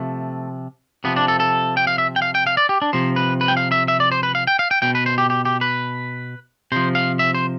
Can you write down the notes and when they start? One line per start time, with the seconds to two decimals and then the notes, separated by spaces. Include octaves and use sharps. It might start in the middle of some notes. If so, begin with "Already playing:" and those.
Already playing: C3 F3 A3
1.04 C3 F3 B3
1.16 D4
1.28 A4
1.40 A4
1.77 G5
1.87 F5
1.98 E5
2.16 G5
2.22 F5
2.35 G5
2.47 F5
2.57 D5
2.69 G4
2.82 D4
2.93 C3 F3 C5
3.16 B4
3.41 B4
3.48 G5
3.57 F5
3.72 E5
3.88 E5
4.00 D5
4.12 C5
4.23 B4
4.35 F5
4.47 G5
4.59 F5
4.71 G5
4.82 B2 G5
4.95 B4
5.06 C5
5.18 G4
5.30 G4
5.45 G4
5.61 B4
6.72 C3 F3 C5
6.95 F5
7.19 E5
7.34 C5